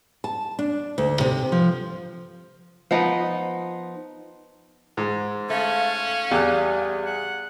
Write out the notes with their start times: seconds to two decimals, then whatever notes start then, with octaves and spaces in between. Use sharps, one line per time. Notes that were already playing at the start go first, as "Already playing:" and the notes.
0.24 A5
0.59 D4
0.98 D2
1.20 C3
1.52 F3
2.91 F3 B3 D#4
4.97 G#2
5.50 A3 C#4 F5
6.31 E2 G3 F#6
7.06 F#5